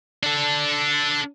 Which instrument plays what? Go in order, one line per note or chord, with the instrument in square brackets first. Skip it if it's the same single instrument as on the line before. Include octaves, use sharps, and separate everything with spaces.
[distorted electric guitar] D4 A4